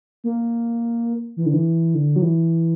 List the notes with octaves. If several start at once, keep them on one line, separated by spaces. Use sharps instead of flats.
A#3
E3
D3
E3
D3
F#3
E3